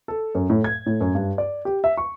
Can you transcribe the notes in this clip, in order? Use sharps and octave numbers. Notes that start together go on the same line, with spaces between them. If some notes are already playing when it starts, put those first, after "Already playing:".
A4
F#2
A2
G#6
A2
F#2
G2
D5
G4
E5
C#6